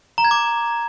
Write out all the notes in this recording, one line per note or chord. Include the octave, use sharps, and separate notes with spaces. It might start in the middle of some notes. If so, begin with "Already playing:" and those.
A#5
G#6
D6